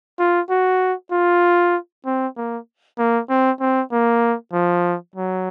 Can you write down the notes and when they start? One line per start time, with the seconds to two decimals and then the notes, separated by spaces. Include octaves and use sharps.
0.19 F4
0.50 F#4
1.12 F4
2.06 C4
2.37 A#3
2.99 A#3
3.30 C4
3.61 C4
3.92 A#3
4.53 F3
5.16 F#3